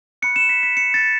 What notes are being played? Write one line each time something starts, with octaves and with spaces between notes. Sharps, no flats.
B5 F#6 C#7
E7
B6
B6
C#7
A6